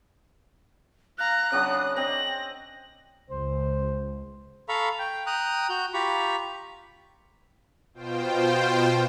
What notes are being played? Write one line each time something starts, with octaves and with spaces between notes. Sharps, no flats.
F5 A#5 F#6
C#3 F#3 D4 D#6
C4 D#5 A#6 F#7
C#2 C5
A4 F5 A#5 B5 C#6
G5
G5 A#5 D#6 F#6
F#4 G6
F4 G4 A#5 B5 C#6
B2 F4 C5 G5